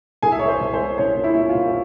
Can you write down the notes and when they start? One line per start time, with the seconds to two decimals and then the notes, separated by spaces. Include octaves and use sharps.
0.22 C2 G#4 G#5
0.32 E5
0.39 C2 C#5
0.48 C5
0.61 C2
0.74 C5
0.79 G#3
0.98 C2 C#4 C#5
1.17 A#2
1.24 E4 E5
1.36 A#2
1.49 F4 F5
1.55 C2